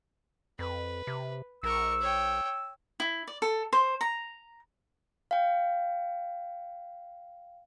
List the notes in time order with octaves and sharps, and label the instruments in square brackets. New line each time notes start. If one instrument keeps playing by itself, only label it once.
[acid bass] F2 [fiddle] B4
[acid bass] C3
[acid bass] A#1 [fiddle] A#4 C#6 [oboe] E6
[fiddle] C#5 G5
[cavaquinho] E4
D5
A4
C5
A#5
[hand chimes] F5 G5